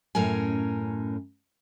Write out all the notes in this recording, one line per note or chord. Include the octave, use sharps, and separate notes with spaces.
F#2 A2 C#4 A#4 G#5